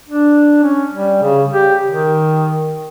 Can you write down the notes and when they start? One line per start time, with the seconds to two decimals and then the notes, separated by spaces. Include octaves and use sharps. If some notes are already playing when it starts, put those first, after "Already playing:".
0.09 D4
0.64 C#4
0.93 G3
1.22 C#3
1.53 G4
1.88 D#3